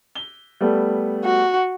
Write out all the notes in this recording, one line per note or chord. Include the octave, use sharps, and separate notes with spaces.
G7
G3 A3 B3
F#4